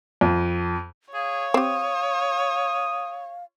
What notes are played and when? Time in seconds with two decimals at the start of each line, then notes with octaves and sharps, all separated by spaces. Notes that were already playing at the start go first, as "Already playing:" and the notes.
0.21 F2
1.14 G#4 C#5 F5
1.54 C4 G4 D#6